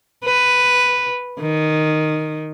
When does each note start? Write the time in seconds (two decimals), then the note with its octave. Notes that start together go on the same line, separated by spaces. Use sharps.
0.25 B4
1.40 D#3